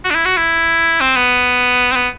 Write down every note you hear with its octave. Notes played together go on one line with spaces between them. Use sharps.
F#4
D4
E4
F#4
E4
C4
B3
C4
B3